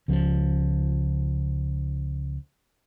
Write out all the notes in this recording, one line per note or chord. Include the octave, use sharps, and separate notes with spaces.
C#2 F3